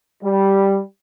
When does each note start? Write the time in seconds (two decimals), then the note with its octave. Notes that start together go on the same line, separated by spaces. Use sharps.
0.24 G3